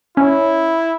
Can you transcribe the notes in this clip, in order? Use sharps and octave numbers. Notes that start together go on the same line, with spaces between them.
C#4 E4